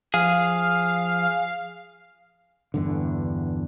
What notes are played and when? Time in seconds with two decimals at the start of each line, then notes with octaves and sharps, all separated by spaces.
0.14 F3 G#4 F5 F6
2.74 E2 G2 D3